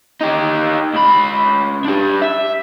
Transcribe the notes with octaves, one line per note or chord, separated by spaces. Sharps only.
D#4 G4
C#2 B5
D4 G4
E5